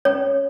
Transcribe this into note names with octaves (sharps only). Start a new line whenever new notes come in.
C#4 C#5